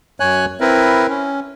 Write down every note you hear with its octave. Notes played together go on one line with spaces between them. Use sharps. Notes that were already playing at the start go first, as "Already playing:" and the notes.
F#2 C#5 G#5 F#6
C4 E4 A#4 B4
C#4